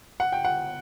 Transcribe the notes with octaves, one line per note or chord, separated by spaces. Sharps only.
F#5
G5
F#5